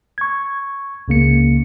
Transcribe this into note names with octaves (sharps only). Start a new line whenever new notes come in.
C#6 G#6
C#2 C#3 A#3 C#7